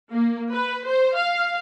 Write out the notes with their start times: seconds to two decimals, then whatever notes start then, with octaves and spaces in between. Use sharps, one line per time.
0.13 A#3
0.52 B4
0.87 C5
1.17 F5